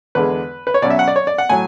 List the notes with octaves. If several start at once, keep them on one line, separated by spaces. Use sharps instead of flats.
E2 D3 G#3 B4
B4
C#5
B2 F#3 C#4 D5
E5
F#5
D5
C#5
D5
F#5
A2 F#3 G#5